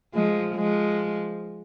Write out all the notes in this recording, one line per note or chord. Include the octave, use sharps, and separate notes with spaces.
F3 G#3
F3 G#3